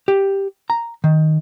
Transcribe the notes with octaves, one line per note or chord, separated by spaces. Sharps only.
G4
A#5
D#3